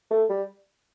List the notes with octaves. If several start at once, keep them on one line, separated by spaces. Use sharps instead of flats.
A3
G3